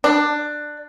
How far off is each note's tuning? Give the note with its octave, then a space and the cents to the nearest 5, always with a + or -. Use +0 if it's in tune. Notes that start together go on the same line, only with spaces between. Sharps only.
D4 +15